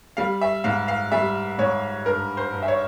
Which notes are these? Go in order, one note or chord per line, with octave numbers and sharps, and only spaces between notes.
G3 F5
E5
G#2 F5
F5
G3 E5
G#2 C#5
G2 A#4
C5
G2
E5
C#5